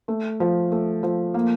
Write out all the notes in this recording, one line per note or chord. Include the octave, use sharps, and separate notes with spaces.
A3
F3
A3
F3
A#3